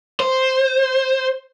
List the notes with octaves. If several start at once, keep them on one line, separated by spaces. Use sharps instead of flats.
C5